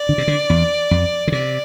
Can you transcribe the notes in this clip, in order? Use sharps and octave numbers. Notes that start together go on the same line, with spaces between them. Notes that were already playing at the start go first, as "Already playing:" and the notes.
Already playing: D5
D3
C3
D3
E2
F2
D3
C3 D5